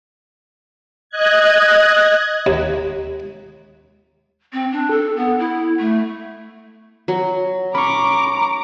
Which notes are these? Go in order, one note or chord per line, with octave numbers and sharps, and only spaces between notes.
D#5 F#6 G#6
D#2
C4
D4
A4
B3
E4
A3
F#3
C#4 A#5 B5 C#6 D6